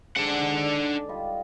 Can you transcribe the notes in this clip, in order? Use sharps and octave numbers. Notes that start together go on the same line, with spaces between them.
G#2 D3 D4 G#4 F#5
A4 D5
G3 F4 D#5